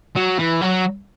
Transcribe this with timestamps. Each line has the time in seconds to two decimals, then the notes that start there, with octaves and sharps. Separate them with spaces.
0.15 F#3
0.39 E3
0.61 F#3